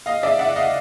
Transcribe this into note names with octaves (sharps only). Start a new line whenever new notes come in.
D#5 F5
D5 E5
E5 F#5
D#5 F5